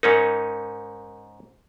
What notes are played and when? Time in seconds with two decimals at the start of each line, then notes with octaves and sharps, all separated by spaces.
0.03 G#2 C#4 D#4 A#4